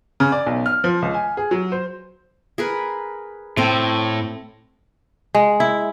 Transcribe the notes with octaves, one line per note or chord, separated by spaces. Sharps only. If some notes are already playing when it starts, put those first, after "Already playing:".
C#3
D5
B1
F6
F3
C#2
G#5
G#4
F#3
C5
G#4 A#4 B4
A2 C4 A4 C5
G#3
E4